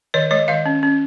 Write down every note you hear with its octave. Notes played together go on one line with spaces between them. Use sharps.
D#3 C#5 D#5
G#3 C#5 D#5
D#3 D#5 F5
C#4
C#4